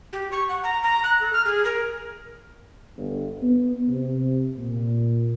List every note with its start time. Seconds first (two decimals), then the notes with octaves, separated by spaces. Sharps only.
0.13 G4
0.32 C#6
0.49 F#5
0.64 A#5
0.83 A#5
1.04 F#6
1.20 A4
1.33 F6
1.45 G#4
1.65 A#4
2.96 G1
3.42 B3
3.88 C3
4.57 A#2